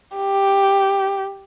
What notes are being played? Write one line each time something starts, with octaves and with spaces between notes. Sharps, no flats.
G4